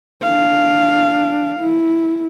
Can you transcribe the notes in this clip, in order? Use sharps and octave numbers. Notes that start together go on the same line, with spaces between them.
D4 F5
E4